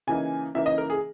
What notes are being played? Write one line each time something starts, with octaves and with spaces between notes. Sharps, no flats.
C#3 E3 A#3 D#4 G#5
C#3 E3 A#3 D#4 E5
D#5
A#4
G#4